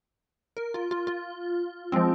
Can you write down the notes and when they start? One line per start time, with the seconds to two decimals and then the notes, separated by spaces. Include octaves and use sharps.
0.57 A#4
0.74 F4
0.91 F4
1.07 F4
1.92 F3 G#3 C4